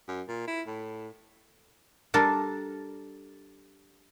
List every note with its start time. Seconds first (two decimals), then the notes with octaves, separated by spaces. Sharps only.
0.08 F#2
0.28 A#2
0.48 E4
0.67 A2
2.14 G3 D4 A4 A#4